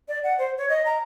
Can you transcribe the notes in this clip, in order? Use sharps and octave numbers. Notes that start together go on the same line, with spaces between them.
D5
F#5
C5
C#5
D#5
A#5